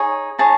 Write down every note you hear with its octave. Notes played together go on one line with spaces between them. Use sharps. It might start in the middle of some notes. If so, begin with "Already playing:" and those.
Already playing: D#4 G#4 C#5
D#4 G#4 C#5 A5